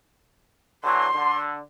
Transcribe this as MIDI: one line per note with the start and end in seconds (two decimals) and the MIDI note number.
0.84 1.06 50
0.84 1.06 52
0.84 1.06 54
0.84 1.37 84
1.14 1.58 50